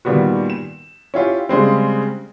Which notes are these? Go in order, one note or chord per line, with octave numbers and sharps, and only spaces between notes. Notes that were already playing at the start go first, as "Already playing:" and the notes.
A#2 D#3 G3 B3 F#4
E7
C#4 E4 F4 G4
C#3 G3 G#3 C4